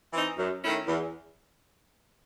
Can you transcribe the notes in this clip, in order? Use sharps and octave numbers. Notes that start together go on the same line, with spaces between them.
E3 C4 D#4
F#2
D#3 A3 C#4 E4
E2